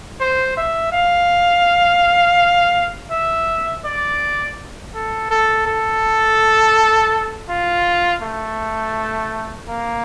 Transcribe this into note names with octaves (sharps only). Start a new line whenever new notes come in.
C5
E5
F5
E5
D5
A4
A4
A4
F4
A3
A#3